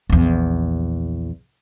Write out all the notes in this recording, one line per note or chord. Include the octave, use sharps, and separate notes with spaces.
A#1 E2